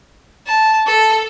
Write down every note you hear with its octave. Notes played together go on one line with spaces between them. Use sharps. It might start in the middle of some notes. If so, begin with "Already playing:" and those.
A5
A4